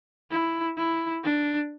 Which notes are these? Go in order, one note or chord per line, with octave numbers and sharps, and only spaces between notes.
E4
E4
D4